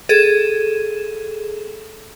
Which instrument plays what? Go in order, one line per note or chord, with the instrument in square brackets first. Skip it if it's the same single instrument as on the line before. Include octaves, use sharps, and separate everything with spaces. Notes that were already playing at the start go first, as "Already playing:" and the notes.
[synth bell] G#4 A4 E7